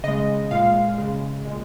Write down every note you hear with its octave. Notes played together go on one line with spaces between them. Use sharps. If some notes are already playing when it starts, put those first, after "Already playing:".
C#3 G#3 D#5
A#2 G#3 F5
C#3 G#3
A#2 G#3